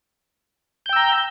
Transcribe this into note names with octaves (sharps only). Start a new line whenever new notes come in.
G5 A#5 E6 G6